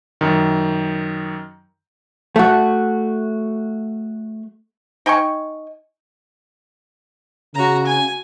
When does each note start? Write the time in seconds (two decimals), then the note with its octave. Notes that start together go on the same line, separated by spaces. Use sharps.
0.21 F#2 D#3
2.36 A3 F#4
5.06 D#4 G5 G#5 C#6
7.55 C#3 F#4 A#5
7.86 G#5